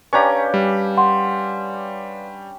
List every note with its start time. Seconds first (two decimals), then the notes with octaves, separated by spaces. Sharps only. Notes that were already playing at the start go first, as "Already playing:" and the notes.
0.13 C#4 D4 G4 B4 D5 F5 A#5 C#6
0.54 G3
0.97 F#5 C6